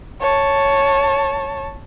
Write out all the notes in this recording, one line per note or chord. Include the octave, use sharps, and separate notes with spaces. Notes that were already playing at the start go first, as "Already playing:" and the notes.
C#5 A5